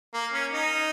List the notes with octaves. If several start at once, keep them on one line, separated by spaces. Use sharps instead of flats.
A#3
C#4
D#4